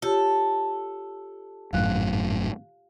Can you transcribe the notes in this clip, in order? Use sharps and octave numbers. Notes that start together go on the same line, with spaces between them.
F4 G4 A4 C#5
G#1 F#2 A2 F5 F#6